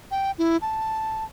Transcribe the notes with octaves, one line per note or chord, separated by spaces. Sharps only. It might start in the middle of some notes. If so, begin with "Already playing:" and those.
G5
E4
A5